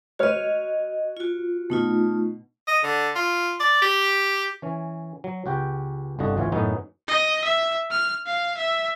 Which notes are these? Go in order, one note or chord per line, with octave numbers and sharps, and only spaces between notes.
F#4 B4 C#5 D#5 F6
F4 F#4
B2 A3 D#4 F4
D#5
D3
F4
D5
G4
E3 C#4
F#3
C#2 F#4 G4 G5
G1 C2 D3 F#4 D#5
G#1 D2 E3 F4 C#5
F#2 A2 D#3 B3 C#4 D#4
D#5
E5
F6
F5
E5